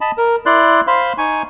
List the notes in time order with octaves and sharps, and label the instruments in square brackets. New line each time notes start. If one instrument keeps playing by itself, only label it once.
[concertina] D#5 A5 B5
A#4
E4 D5 C6 F#6
C5 F5 B5 C6
D#4 G#5 C#6